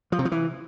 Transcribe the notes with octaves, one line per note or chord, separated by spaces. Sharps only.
F3
C3
F3
E3